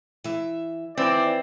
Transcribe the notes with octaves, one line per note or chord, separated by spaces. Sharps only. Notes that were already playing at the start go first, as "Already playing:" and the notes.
E3 E5
D#2 E3 C4 D5